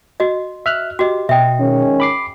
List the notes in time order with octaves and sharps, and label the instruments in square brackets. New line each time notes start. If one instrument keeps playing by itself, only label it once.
[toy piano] F#4 D#5
[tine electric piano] E5 F6 F#6
[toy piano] F#4 D#5 [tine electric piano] G4
[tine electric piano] B2 D#5 [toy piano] E5 G5
[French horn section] D#3 G#3 C#4
[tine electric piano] B5 D6 C7